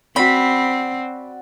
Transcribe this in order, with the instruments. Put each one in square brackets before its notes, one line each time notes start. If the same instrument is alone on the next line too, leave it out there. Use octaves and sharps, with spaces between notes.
[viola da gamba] C4 [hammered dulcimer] F#4 D5 [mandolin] B5